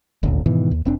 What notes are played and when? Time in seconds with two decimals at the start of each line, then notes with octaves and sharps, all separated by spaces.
0.23 D#1 G#1 D2
0.46 G#2 B2 D#3 E3
0.71 D#2
0.85 F1 C4 D4